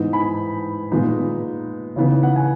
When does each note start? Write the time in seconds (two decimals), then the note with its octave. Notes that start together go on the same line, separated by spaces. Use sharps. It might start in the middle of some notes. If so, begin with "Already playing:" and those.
Already playing: G#2 E3 B3 D#4
0.13 G#5 B5
0.92 A#2 G#3 B3 D#4
1.96 C#3 E3 B3 D#4
2.23 F#5
2.36 G#5